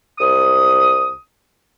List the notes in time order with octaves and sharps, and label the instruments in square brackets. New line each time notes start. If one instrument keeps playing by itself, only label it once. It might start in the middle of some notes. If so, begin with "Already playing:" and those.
[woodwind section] C2 D#6